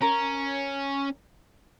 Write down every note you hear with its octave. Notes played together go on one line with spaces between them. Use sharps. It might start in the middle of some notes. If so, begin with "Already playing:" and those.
C#4 A#4